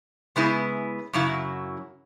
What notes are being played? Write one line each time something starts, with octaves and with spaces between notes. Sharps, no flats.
C#3 G#3 B3 E4
F#2 C#3 F#3 E4